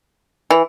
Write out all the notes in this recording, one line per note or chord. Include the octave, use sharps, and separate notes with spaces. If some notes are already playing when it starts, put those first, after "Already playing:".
E3